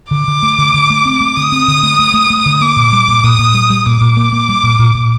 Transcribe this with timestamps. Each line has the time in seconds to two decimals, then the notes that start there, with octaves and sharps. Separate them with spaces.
0.11 D3 D6
0.28 D3
0.43 A3
0.58 D3
0.74 D3
0.90 A3
1.05 C4
1.20 A3
1.36 D3 D#6
1.52 C4
1.68 D3
1.83 A3
1.99 A3
2.14 A3
2.30 A3
2.46 D3
2.61 A#3 D6
2.76 A#2
2.93 G3
3.08 A#2
3.23 A#2 D#6
3.39 A#2
3.54 G3
3.70 G3
3.85 A#2 D6
4.01 A#2
4.17 A#3
4.32 A#3
4.49 G3
4.63 A#2
4.79 A#2
4.94 A#2